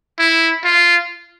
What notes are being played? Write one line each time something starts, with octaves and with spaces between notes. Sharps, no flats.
E4
F4